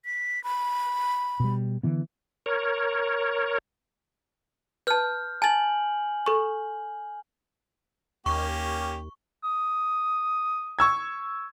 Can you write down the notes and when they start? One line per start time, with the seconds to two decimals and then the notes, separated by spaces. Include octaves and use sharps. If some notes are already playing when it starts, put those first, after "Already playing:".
0.05 B6
0.44 B5
1.40 B2 G3
1.83 D3 E3 B3
2.46 A#4 C#5
4.87 B4 A5 F6 G6
5.42 G#5 A5 A6 F#7
6.26 A4 C#6
8.26 D#2 A#3 C#4 G4 C#6
9.43 D#6
10.79 C#6 E6 G#6